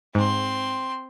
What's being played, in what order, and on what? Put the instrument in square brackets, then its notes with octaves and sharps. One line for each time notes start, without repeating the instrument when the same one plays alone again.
[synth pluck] G#2 [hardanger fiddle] C4 C6